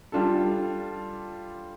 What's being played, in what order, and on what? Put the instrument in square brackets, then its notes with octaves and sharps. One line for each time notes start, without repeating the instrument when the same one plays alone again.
[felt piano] G3 D4 F4 A4